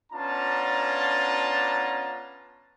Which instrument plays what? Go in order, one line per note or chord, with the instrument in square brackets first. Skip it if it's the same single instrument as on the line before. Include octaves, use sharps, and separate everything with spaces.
[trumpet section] B3 C#4 D4 F4 A5 A#5